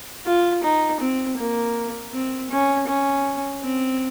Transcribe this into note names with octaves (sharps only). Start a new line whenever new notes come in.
F4
D#4
C4
A#3
C4
C#4
C#4
C4